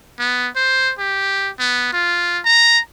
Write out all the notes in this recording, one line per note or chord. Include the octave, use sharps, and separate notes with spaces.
B3
C5
G4
B3
F4
A#5